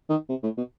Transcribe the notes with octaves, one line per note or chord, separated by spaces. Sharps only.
D#3
C3
A2
B2